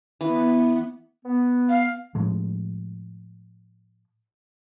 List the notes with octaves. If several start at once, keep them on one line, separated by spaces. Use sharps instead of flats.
E3 B3
B3
F5
A2 F3 G#3